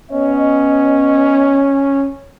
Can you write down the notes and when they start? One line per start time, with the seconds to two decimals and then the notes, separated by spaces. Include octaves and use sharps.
0.11 B3 C#4 C#5 D#5